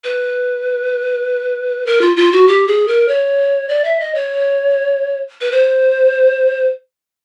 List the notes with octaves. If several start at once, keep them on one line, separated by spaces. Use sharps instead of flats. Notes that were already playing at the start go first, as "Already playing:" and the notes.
B4
A#4
F4
F4
F#4
G4
G#4
A#4
C#5
D5
E5
D#5
C#5
B4
C5